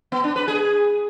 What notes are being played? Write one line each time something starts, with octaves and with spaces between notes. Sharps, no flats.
B3
D4
B4
G#4